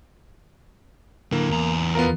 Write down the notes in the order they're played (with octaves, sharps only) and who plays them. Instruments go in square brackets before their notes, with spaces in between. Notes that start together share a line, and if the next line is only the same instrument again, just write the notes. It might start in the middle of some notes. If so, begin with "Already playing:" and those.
[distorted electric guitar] D3 E4 [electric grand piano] A#3
[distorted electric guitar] E2 A#5
[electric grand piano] B3 F4 A#4